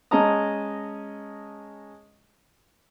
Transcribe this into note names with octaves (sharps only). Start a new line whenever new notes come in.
G#3 C#4 D#5 A5 A#5 D#6